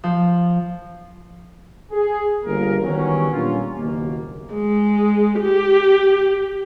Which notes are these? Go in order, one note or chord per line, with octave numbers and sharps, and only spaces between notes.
F3
G#4
G1 A#3 A#4
D#3 E3 F#3 G3 B3 C#4
A#2 G3 C#4 D4 F4
F#1 D#2 B2 A#3
G#3
G4